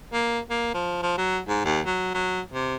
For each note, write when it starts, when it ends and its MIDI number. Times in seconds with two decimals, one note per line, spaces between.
0.13 0.39 58
0.50 0.71 58
0.74 1.00 53
1.02 1.15 53
1.17 1.39 54
1.48 1.63 44
1.65 1.80 39
1.86 2.10 54
2.14 2.41 54
2.53 2.76 48